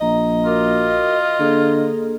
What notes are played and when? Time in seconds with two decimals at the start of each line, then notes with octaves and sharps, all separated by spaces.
0.01 A#1 D#5 A#5
0.45 F4 F#4 A#4 D6
1.40 D3 A#3 G#4 A4